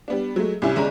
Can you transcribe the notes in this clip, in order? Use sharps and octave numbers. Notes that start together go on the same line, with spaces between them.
G3 B3 D4
F#3 G#3 A3
C2 C3 C#4 E4 G#5
G1 G#3 C#4 D5 A#5